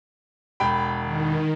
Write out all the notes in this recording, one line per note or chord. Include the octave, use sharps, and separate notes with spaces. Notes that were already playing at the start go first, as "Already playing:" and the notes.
E1 G5 B5
D#3